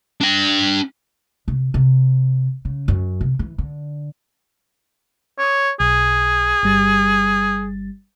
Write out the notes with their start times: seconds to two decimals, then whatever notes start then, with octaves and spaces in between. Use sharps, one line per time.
0.21 D4 G5
1.48 C3
1.74 C3
2.65 C#3
2.88 F#2
3.21 C3
3.39 E3
3.58 D3
5.39 C#5 D6 D#6
5.80 B1 G#4
6.63 G1 G3 A6